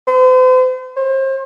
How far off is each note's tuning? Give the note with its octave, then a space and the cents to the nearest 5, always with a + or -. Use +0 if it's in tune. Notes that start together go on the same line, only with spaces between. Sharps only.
C5 -40
C5 +35